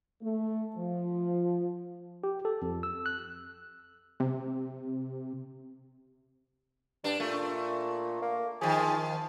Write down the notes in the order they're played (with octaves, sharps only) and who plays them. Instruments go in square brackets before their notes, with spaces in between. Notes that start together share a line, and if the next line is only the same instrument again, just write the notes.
[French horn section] A3
F3
[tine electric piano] G4
A4
F2
E6
F#6
[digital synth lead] C3
[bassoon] G2 [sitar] D4
[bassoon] A#2 [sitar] A3
[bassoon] A#3
[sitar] D#3 F3 [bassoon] G#4